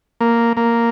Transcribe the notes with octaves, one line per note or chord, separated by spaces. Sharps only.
A#3
A#3